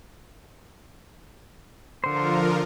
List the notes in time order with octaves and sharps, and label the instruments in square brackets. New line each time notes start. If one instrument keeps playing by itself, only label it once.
[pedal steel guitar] D3 C5 [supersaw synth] F3 F4 A#4